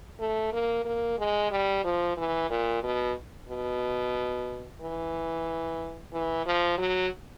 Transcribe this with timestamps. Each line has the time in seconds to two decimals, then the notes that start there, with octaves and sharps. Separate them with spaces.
0.20 A3
0.53 A#3
0.85 A#3
1.19 G#3
1.51 G3
1.84 F3
2.17 E3
2.50 A#2
2.83 B2
3.49 B2
4.81 E3
6.13 E3
6.46 F3
6.78 F#3